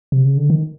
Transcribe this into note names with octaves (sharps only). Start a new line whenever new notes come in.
C3
C#3
D3
D#3